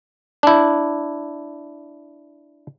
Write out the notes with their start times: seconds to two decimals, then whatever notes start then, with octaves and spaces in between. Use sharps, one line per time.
0.43 D4 E4